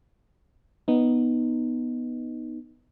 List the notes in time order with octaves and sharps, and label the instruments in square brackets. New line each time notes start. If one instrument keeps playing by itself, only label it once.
[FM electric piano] B3 D#4